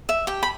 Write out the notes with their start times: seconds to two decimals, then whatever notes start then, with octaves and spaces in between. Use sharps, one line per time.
0.09 E5
0.27 G4 G5
0.43 B5